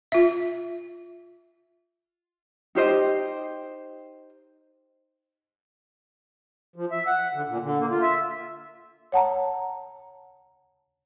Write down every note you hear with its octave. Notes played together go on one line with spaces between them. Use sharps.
F4 E5
D#4 G4 C5 D#5
F3
E5
F#5
D3
A#2
D3
A#3
F4
E5
C#5 F#5 A5 A#5